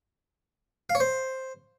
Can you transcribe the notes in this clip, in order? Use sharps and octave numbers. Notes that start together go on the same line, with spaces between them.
F5
C#5
C5